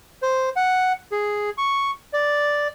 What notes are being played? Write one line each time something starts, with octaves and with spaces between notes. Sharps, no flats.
C5
F#5
G#4
C#6
D5